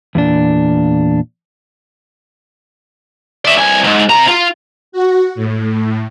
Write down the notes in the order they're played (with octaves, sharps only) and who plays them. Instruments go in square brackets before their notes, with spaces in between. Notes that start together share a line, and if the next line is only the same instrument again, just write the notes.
[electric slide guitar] E2 A#2 D4
[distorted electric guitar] D5 E5
C2 G#5
G#2
C3 A#5
F4
[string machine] F#4
A2